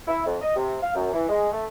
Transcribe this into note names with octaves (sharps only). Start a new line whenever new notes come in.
E4
F2
D#5
C3
F5
F#2
E3
G#3
A3